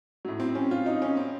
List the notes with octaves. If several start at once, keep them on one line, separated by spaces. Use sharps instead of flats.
A2 F#3
C4
C#4
F4
D#4
C#4
C4